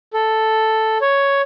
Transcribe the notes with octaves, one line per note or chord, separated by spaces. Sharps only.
A4
C#5